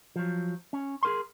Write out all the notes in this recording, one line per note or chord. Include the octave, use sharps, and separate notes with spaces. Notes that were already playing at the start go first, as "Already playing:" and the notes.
F3 F#3
C#4
G#4 A#4 C6